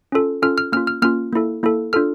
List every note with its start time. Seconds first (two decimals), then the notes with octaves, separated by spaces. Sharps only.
0.12 C#4 F4 A4
0.42 C#4 F4 A4 F6
0.58 F6
0.72 A#3 C#4 F4 F6
0.87 F6
1.02 A#3 C#4 F4 F6
1.33 A#3 E4 A4
1.63 A#3 E4 A4
1.93 D4 F4 A4 F6